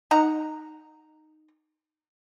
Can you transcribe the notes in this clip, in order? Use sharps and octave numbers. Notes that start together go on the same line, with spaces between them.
D#4 F#5 A#5